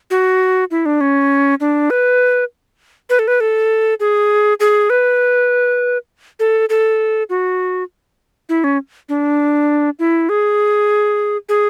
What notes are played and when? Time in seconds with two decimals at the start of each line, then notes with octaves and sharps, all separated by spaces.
0.11 F#4
0.71 E4
0.86 D4
1.01 C#4
1.60 D4
1.90 B4
3.10 B4
3.19 A4
3.28 B4
3.40 A4
4.00 G#4
4.60 G#4
4.90 B4
6.40 A4
6.69 A4
7.30 F#4
8.49 E4
8.64 C#4
9.09 D4
9.99 E4
10.29 G#4
11.49 G#4